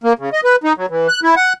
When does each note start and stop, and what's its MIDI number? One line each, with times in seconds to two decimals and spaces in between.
0.04 0.13 58
0.19 0.30 49
0.33 0.41 75
0.44 0.56 71
0.64 0.73 63
0.77 0.86 54
0.90 1.08 52
1.08 1.20 90
1.23 1.35 64
1.37 1.53 78